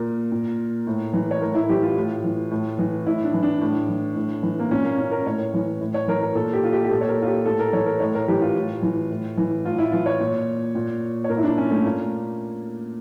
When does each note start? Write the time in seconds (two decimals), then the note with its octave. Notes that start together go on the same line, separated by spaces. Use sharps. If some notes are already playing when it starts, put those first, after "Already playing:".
Already playing: A#2 A#4
0.32 A#2
0.87 A2
1.13 E3
1.31 C#5
1.41 A2 A#4
1.55 E4
1.69 E3 G4
1.83 F4
1.97 A2
2.24 E3
2.51 A2
2.79 E3
3.06 A2 E4
3.24 D4
3.34 E3
3.43 D4
3.61 A2
3.89 E3
4.16 A2
4.43 E3
4.59 A#3
4.70 A#2 C#4
4.84 A#3
4.98 C#4
5.11 A#4
5.26 A2 C#5
5.54 E3
5.81 A2
5.94 C#5
6.08 E3 A#4
6.22 A#4
6.35 A#2 A4
6.53 G4
6.64 F4
6.73 G4
6.84 G4
6.91 A#2 A4
7.01 C#5
7.08 A#4
7.22 F4
7.26 G4
7.46 A2 A4
7.59 A#4
7.73 E3 C#5
7.86 A#4
8.00 A2 C#5
8.15 A#4
8.28 E3 G4
8.42 F4
8.56 A2
8.82 E3
9.10 A2
9.37 E3
9.64 A2 F4
9.78 E4
9.92 E3 F4
10.06 C#5
10.20 A#2
10.75 A#2
11.24 C#5
11.30 A#2 A#4
11.37 E4
11.43 D4
11.58 C#4
11.71 A3
11.85 A#2 A#3